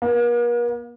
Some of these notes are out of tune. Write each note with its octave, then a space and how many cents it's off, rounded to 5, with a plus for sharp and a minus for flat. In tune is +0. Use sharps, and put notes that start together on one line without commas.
A#3 +45